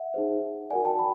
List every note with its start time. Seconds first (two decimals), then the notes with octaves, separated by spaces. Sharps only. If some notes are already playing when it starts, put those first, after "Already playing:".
Already playing: E5 F#5
0.14 D#4 G#4 C5
0.70 F#4 A#4 D5 F#5 G#5
0.85 G5 A5
0.99 B5